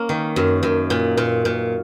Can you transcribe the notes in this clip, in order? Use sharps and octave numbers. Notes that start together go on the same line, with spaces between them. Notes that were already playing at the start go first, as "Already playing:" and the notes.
Already playing: A#3 C#4
D#3
F#2
F#2
A#2
A#2
A#2